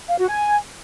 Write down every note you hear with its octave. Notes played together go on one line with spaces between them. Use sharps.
F5
F#4
G#5